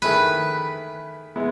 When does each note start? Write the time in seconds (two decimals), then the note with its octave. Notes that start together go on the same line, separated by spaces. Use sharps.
0.02 D#3 A3 E4 G#4 B4
1.36 G#3 B3 E4